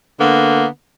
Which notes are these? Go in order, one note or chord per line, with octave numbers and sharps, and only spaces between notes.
D3 A#3 B3